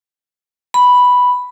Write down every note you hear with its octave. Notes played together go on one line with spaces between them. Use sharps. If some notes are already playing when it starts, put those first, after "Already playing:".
B5